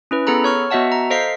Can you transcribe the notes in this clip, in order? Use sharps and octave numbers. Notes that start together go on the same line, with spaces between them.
C#4 E4 B4
B3 G#4 A4 A#5 B5
C#5 C#6 F6
B3 F#4 D#5 E5 F#5 A5
A#5
A4 C5 D#5 F5 B6 C7